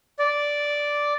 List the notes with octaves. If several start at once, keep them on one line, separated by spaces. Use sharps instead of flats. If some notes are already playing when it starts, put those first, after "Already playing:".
D5